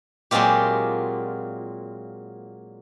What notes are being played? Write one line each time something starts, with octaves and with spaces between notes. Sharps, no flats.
A#2 F#3 G#3 C4 F4 G4